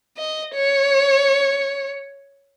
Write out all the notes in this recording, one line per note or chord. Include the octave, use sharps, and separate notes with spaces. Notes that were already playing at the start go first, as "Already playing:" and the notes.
D#5
C#5